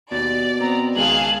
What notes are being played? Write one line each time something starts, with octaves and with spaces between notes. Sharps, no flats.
D#2 B2 D5 A6
B3 C4 A#5
C#2 D#3 G#3 G#4 F5 A5 F#7